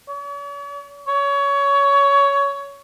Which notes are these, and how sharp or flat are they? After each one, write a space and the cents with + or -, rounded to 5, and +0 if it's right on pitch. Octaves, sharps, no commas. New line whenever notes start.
C#5 +45
C#5 +20